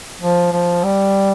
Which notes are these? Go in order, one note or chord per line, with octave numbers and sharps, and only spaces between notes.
F3
F3
G3